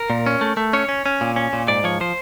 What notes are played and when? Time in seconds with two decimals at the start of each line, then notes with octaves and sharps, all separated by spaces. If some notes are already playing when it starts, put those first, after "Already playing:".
Already playing: A#4
0.10 A#2
0.26 C#4
0.41 A3
0.57 A3
0.73 C#4 C#5
0.89 C#4
1.06 C#4
1.21 A#2
1.36 C#4
1.53 A#2
1.68 G#2 D5
1.84 F3 C#5
2.00 F3 C5